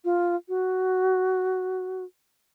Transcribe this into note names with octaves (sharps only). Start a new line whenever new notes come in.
F4
F#4